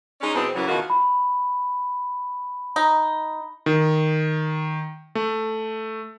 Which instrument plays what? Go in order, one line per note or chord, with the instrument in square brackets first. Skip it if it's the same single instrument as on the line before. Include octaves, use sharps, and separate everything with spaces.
[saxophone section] G#3 C#4 D#4 G#4 D5
B2 E3 G#3 C4
F#2 C#3 E3 F#3
B2 D#3 E3 F4 F#4
[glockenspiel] B5
[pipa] D#4
[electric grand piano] D#3
A3